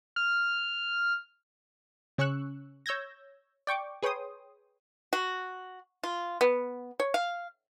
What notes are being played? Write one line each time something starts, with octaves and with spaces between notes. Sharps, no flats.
F6
C#3 C#4 C#6 E6 F#6
C#5 E6 G6 G#6 A#6
D5 G5 C#6 D6
G#4 B4 C#5 G5 C6 D#6
F#4
F4
B3
C#5
F5